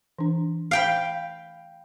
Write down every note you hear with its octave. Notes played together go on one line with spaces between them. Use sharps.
E3 D4
F5 G5 B5